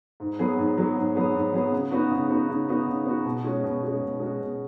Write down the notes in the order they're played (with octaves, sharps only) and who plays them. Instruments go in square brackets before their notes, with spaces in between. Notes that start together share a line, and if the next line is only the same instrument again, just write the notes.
[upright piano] G#2
F#3 B3 G#4
G#2
F#3 B3 G#4
G#2
F#3 B3 G#4
G#2
F#3 B3 G#4
C#3
B3 D#4 F#4
C#3
B3 D#4 F#4
C#3
B3 D#4 F#4
C#3
B3 D#4 F#4
B2
G#3 C#4 F#4
B2
G#3 C#4 F#4
B2
G#3 C#4 F#4
B2